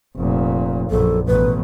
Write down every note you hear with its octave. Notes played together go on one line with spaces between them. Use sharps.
F1 A#2
A#1 F#2 A4
A1 B2 B4